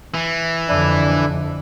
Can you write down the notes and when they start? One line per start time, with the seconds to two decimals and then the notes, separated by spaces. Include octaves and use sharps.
0.14 E3
0.69 F2 D3 D4 E4